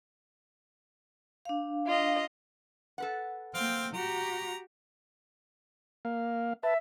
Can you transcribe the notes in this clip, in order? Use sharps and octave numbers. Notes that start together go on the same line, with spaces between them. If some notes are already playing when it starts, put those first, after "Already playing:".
D4 F5
F4 D#5
A4 B4 F#5
A#3 C4 F5 G5
F#4 G4 A#5
A#3 F5
B4 E5 A5